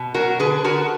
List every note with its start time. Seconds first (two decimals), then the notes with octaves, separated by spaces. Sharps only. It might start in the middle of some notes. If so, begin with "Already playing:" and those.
Already playing: B2
0.14 F#3 F#4 A#4
0.39 D3 G#4 B4
0.64 D3 F#4 A#4